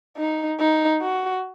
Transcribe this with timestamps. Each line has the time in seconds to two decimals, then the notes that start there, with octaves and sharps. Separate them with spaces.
0.17 D#4
0.59 D#4
1.01 F#4